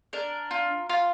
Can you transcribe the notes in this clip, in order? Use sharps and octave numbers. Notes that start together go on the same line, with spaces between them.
D4 A#4
F4
F4